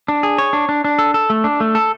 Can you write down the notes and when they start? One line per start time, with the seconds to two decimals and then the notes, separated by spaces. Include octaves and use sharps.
0.08 D4
0.23 G#4
0.38 C#5
0.53 D4
0.69 D4
0.84 D4
0.99 A4
1.14 A4
1.30 A3
1.44 D4
1.60 A3
1.75 A4